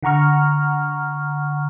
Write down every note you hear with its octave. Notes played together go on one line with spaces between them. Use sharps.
D3 F#5 A#5 C#6 F6